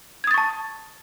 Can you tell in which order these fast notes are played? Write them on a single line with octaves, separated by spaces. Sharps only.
G#6 D#6 A6 C#6 A5